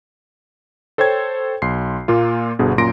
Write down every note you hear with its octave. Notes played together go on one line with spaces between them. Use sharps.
A4 C5 C#5 G5 G#6
B1 C6 C7
A#2 A#3 F4
G1 B2 D3 G#4
F#2 A#2 A#5 C6 A#6 D7